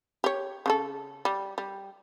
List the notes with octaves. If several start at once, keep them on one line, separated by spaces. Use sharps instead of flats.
G4 C#5
C#3 D4 A4
G3
G3